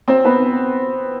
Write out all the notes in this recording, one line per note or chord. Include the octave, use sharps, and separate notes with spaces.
C4 C5
B3 B4